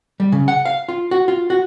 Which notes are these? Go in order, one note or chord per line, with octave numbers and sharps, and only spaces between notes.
G3
C#3
F#5
F5
F4
F#4
F4
F#4